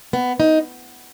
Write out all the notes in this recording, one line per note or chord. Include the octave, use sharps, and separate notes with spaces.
B3
D#4